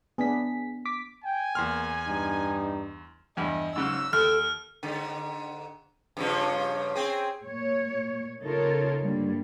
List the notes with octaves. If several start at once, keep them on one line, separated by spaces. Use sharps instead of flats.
B3 D4 G#4 B6
D6 B6
G5 G#5
E2 A#3 C6 F6
G2 D#4
E2 G2 D#5
G#2 C#3 F#3 E6
D#2 A4 F6
G#2 D3
G2 C#3 F3
C4 G#4
A#2 C#5
C#3 D#4 F4 A4 A#4 C#5
G2 D3 G3 A#3